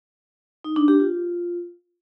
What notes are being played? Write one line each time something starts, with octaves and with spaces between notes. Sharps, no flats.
D#4
D4
G4
F4